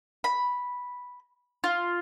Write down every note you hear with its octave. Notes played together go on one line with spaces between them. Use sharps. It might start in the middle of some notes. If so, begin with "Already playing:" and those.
B5
F4